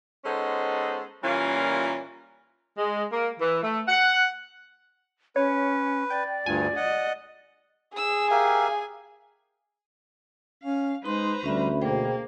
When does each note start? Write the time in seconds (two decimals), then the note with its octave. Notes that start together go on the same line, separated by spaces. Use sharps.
0.25 G#3 B3 C#4 D#4 A4 C5
1.23 A#2 E3 G3 A#3 C#4 F4
2.77 G#3
3.11 A#3
3.39 E3
3.62 A3
3.88 F#5
5.36 C#4 B4 C#5
6.10 D5 G5
6.46 D2 G2 F4 G#5
6.76 D#5 F#5
7.96 G#4 E6
8.31 G4 A#4 E5 F5 G#5
10.63 C#4 F5
11.05 G#3 D#4 B4 C5 A#5 C6
11.44 D2 G3 C#4 E5 B5
11.82 B2 A#3 G#4 C5 G5